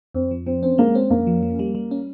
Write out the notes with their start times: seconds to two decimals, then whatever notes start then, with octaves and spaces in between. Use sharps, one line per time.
0.14 F2 C4
0.31 F3
0.46 F3 C4
0.63 C4 C#4
0.78 G#3 A#3
0.95 C4 C#4
1.10 F2 A#3
1.27 F3
1.43 F3
1.59 G3
1.75 G3
1.91 C#4